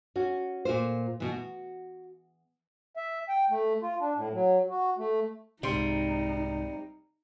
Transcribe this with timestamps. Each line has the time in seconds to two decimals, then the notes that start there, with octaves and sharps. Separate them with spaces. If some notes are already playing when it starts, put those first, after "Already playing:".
0.16 C#4 F#4
0.65 A#2 F4 C5
1.20 B2 E3
1.32 F#4
2.97 E5
3.29 G5
3.50 A3
3.83 F4
4.00 D4
4.16 A2
4.33 F#3
4.70 F#4
4.98 A3
5.63 C2 G#2 C3 G3 D#4 C6